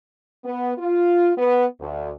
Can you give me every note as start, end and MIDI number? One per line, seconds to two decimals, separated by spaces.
0.44 0.73 59
0.78 1.32 65
1.37 1.65 59
1.79 2.11 38